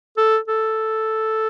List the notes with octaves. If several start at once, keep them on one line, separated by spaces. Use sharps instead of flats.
A4
A4